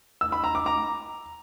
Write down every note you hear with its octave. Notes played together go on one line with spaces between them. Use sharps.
E6
B5
A#5
D6
A#5